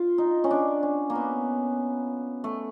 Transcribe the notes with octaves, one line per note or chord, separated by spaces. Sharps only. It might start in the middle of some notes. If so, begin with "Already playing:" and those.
Already playing: F4
D#4
C#4
D4
C#4
A#3
B3
A3